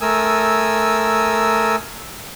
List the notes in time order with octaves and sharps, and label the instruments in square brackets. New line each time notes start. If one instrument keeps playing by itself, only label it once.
[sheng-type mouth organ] A3 A#4 G#5 D#6 E6